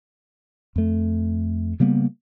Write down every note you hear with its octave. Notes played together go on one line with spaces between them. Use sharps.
F2 A3
C#3 G3 A#3 B3